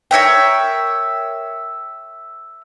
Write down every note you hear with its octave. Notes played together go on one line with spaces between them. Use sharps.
A#4 C#5 E5 G5